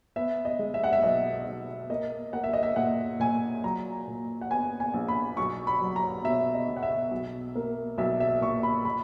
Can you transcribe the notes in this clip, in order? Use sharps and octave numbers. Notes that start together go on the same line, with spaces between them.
B3 E5
D#5
G#3
E5
F#5
E5
B1 D#5
B1
A#3 D#5
A#3 F#5
E5
D#5
E5
A#2 F#5
A#2 G#5
F#3 A#5
A#2
F#5
B3 G#5
G#5
A#1
B5
B1 C#6
B5
F#3
A#5
B2 E5
D#5
B2
F#5
E5
B1
A#3
B1 E5
E5
A#2 C#6
B5
A#2 B5